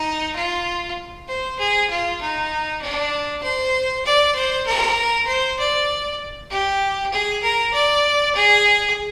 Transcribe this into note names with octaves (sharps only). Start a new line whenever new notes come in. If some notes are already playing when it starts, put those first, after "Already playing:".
Already playing: D#4
F4
C5
G#4
F4
D#4
D4
C5
D5
C5
A#4
C5
D5
G4
G#4
A#4
D5
G#4